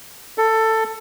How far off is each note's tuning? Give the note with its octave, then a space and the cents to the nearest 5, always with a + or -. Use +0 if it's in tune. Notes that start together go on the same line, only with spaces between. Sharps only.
A4 +15